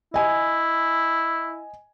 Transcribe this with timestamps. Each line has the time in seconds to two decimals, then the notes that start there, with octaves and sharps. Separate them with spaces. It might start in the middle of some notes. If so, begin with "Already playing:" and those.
0.14 E4 D#5 G#5